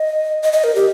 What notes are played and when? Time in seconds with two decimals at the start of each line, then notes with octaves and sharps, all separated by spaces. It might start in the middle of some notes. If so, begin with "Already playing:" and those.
Already playing: D#5
0.43 D#5
0.53 D#5
0.64 A#4
0.75 G4